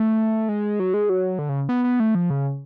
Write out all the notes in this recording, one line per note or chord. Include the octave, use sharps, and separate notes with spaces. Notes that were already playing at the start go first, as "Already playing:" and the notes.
Already playing: A3
G#3
F#3
G#3
F#3
D3
C#3
B3
B3
A3
F3
C#3